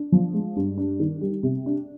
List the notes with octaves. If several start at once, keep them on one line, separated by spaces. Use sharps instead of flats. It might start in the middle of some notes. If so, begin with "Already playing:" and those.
Already playing: D4
F3
G#3
G2
D4
D#3
G3
C3
D4